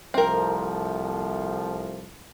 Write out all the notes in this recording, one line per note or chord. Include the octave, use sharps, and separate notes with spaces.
C2 F3 A3 C4 A#4